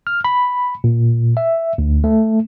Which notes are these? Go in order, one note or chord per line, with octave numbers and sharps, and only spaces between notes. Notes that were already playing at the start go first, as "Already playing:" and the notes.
F6
B5
A#2
E5
D2
A3